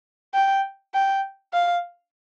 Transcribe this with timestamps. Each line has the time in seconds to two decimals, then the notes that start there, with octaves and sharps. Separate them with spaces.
0.34 G5
0.94 G5
1.53 F5